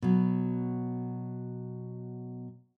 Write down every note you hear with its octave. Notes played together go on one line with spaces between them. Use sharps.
B2 F#3